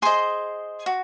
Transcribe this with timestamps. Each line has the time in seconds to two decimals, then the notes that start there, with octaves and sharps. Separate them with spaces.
0.02 G#4 C5 D#5 C6
0.86 F#4